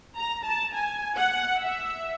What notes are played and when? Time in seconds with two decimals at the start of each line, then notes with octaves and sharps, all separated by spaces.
0.16 A#5
0.44 A5
0.74 G#5
1.16 F#5
1.59 E5